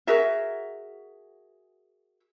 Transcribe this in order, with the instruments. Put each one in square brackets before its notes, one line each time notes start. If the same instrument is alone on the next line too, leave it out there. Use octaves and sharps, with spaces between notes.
[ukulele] F#4 G#4 A#4 E5